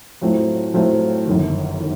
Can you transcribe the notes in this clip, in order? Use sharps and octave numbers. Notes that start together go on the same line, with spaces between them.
A2 F#3 A3 C4 F4
A2 F#3 A3 C4 F4
G1 F#2 D#3
D#3